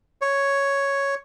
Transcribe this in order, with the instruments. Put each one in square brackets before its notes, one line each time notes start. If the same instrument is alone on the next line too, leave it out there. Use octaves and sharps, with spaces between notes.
[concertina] C#5